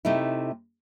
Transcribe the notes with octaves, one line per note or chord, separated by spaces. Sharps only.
C3 A3 D#4 E4